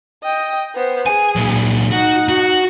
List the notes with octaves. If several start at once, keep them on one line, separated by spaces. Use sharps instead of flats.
D#5 G5
B3 C5
G#4 G#5
A#2 F#3
D#4 F#4 F#5
F#4